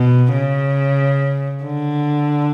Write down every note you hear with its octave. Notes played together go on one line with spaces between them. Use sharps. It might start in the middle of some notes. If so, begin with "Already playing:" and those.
Already playing: B2
C#3
D3